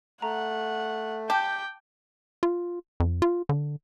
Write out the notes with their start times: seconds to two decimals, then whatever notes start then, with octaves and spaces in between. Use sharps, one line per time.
0.22 A3 F#5 A#5
1.30 G4 G5 A5
2.43 F4
3.00 F2
3.22 F4
3.49 D3